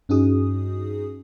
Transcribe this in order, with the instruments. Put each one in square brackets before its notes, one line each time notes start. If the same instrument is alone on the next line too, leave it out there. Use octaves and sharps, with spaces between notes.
[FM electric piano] G2 C#4 D#4 F#4 G#4 D#6